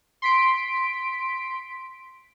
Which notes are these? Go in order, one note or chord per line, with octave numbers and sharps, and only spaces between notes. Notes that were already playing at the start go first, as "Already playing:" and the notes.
C6 B6 D7